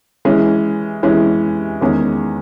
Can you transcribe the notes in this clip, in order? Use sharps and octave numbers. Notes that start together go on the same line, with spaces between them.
E3 G#3 C#4
E3 G#3 C#4
E2 D#3 G#3 C#4 G#4